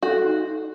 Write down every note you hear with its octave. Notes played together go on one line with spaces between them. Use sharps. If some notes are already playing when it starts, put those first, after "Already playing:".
F#4 A4
D#4